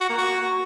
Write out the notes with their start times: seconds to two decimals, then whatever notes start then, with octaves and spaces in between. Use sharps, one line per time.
0.01 F#4
0.09 A#3
0.18 F#4